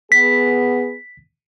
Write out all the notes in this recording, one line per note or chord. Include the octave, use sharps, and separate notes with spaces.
B3 G#4 B6